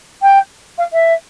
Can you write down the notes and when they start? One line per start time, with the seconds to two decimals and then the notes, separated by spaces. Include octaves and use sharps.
0.22 G5
0.78 F5
0.93 E5